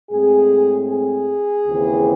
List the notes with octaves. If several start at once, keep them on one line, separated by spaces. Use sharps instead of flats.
A2 G#3 C4 G#4
G#4
D#2 C#3 E3 C4